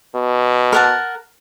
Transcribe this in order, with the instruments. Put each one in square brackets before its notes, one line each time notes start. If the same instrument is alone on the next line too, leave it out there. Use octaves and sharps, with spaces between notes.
[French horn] B2
[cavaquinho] A#4 F#5 A5